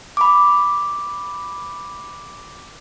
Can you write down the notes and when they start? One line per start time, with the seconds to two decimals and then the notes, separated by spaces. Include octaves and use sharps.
0.17 B5 D6